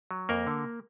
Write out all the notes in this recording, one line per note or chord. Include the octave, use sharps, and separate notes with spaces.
F#3
F2 A#3 A#4
D3